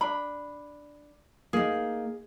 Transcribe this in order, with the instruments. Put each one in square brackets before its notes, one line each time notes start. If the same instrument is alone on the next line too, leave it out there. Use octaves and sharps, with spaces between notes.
[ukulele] D4 B5
[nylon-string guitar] A#3 D#4 [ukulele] G#4